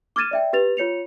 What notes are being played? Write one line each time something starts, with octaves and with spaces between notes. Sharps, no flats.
D6 F6 G#6 A6 D#7 E7
D5 E5 G5
G4 B4 A6 F7
F4 C#5 C#7 F7